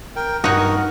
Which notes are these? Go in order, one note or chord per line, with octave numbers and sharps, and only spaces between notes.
A#4 G5
G2 D#4 F#4 A#4 C#5 F#5